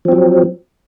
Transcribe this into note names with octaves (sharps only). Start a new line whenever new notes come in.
F3 F#3 C4